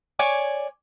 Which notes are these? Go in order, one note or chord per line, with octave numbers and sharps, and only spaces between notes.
C#5 D5 G#5 D6